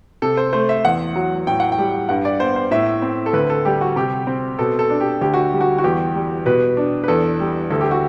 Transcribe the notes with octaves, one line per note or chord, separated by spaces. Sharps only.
C3 A4
C5
A3 C5
E5
E2 F#5
F#3
A2 G5
F#5
G5
G3
G2 F#5
D5
B3 C5
C5
A2 E5
C4
A4
D2 B4
A4
G3 G4
F#4
C3 G4
C4
B2 A4
A4
D4
G4
D2 G4
F#4
G3
F#4
F#4
E2 G4
G3
B2 B4
D4
B4
E2 A4
G3
D2 A4
G4
F#4